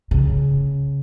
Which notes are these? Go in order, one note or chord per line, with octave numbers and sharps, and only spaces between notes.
C#3